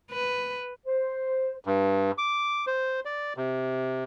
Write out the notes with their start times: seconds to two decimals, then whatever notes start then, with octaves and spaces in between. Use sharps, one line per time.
0.11 B4
0.85 C5
1.65 G2
2.18 D6
2.67 C5
3.05 D5
3.37 C3